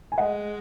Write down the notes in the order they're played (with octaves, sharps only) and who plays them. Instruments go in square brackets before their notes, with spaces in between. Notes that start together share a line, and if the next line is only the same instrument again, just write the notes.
[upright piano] G#5
[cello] G#3 [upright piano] D#5 F#5